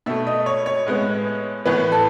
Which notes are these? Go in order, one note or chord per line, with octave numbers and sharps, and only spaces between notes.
B2 A3 E5
D#5
C#5
C#5
A2 G#3 B3
A2 E3 B3 B4
A4